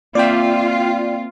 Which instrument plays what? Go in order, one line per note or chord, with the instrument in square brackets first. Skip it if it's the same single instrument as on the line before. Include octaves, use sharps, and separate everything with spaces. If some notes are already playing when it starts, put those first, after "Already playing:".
[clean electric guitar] A#3 C4 E5 [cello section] F4 [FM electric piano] D5 G5